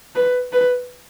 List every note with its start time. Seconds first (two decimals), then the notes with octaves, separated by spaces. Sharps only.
0.15 B4
0.53 B4